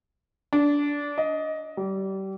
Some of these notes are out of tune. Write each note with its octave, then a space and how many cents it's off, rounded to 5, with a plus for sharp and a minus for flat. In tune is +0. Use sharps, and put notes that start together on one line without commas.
D4 -20
D#5 +10
G3 -30